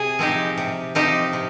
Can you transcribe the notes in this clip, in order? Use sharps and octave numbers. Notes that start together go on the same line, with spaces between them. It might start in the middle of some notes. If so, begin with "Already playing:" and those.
Already playing: C3 G#4
F3 C4 D#4 G4
C3
F3 C4 D#4 G4
C3